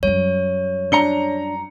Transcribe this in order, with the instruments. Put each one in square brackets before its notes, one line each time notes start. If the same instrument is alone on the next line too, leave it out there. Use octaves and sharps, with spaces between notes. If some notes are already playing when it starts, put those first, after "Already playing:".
[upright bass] F#2 G3 [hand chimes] C#5
[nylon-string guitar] D4 [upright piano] A#5 C#7 G7